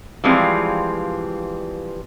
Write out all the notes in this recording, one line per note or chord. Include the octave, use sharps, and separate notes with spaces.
E3 F3 G3 G#3 C4 F4